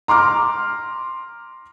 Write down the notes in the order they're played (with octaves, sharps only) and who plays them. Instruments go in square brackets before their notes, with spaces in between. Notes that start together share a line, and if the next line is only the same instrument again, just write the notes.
[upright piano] A#5 C6 D6 F6